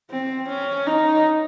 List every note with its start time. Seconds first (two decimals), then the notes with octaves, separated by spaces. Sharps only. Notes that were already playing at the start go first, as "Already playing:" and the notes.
0.10 C4
0.48 C#4
0.87 D#4